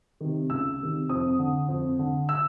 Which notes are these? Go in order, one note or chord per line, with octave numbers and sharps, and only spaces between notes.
C3 D#3
C#2 E6
C3 D#3
F2 D#6
D3
F2
D3
E6